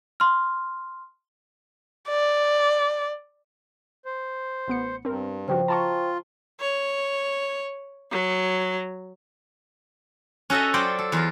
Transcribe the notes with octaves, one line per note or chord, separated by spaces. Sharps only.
C6 F6
D5
C5
A1 B3 C#7
G2 C4 A#4
C#3 F3 F#4 C5 G5
F4 A5 A#5 C#6
C#5
F#3
C#4 F#4 A4 D#5 E5
F#3 F4 C5 D5 G5
A4
E2 F4 A#4